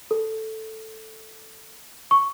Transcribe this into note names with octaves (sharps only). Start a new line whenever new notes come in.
A4
C#6